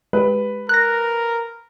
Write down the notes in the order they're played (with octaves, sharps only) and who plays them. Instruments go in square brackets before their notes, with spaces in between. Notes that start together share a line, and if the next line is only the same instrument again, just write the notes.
[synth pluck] G#3 G4 [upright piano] B4
[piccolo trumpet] A#4 [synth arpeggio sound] F#6 A#6